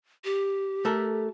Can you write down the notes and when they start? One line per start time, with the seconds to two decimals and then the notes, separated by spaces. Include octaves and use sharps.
0.25 G4
0.85 A3 A4 A#4